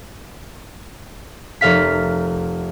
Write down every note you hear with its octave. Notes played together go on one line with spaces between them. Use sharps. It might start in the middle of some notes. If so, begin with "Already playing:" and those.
F1 A#4 F5 B6